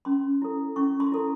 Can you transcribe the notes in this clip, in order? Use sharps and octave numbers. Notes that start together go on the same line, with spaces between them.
C#4 C6
E4 A4
C#4 C#6
C6
E4 A4